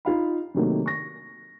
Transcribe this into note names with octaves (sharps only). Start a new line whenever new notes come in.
D#4 F4 F5 B5
C3 D#3 F#3 A3 A#3 D#4
C#6 A#6